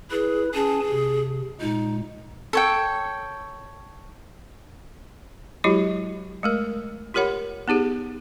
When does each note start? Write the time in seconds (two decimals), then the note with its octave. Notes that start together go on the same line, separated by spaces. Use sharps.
0.11 E4 G#4 B4
0.54 C#4 G#4 G#5 A5
0.90 C3
1.61 A#2 G#3 D#4
2.53 A4 C#5 G5
5.64 F#3 G#3 E4 F#4 G4 D#5
6.43 G#3 A3 A#4
7.14 F4 G4 A#4 C#5 F#5 B5
7.68 B3 D#4 G4 G#4